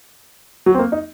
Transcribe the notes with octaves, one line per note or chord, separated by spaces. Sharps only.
F#3
C4
A#3
D#4